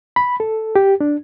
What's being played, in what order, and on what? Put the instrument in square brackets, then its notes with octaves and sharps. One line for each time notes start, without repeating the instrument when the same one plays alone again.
[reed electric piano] B5
A4
G4
D4